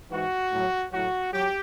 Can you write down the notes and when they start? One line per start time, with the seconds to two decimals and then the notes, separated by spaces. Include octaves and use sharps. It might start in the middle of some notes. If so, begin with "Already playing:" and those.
0.11 G#2 E3 F#4
0.51 A2 F#3
0.92 A2 F#3 F#4
1.32 F#3 G4